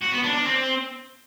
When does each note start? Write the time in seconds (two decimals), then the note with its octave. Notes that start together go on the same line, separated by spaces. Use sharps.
0.03 F#4
0.13 B3
0.24 D4
0.34 D4
0.45 C4